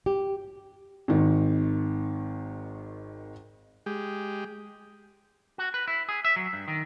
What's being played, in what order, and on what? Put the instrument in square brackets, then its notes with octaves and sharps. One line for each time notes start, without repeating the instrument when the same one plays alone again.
[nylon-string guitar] G4
[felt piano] G#1 D#3
[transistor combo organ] G#3 G4
[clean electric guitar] F#4
B4
E4
G#4
E5
F#3
G2
D#3